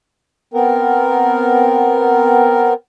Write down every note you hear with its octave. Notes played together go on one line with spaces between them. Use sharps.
B3 C4 A#4